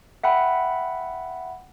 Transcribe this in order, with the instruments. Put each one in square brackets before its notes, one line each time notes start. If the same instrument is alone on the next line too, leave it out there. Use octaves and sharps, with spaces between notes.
[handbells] E5 F#5 G5 B5